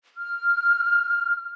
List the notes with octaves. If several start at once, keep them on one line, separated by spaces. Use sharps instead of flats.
F6